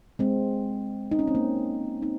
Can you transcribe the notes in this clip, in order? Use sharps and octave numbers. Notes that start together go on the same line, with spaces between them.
G#3 C4
D#4
C#4
C4
A#3 C#4
C4 D#4